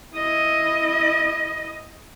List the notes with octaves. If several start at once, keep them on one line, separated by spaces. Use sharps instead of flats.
E4 D#5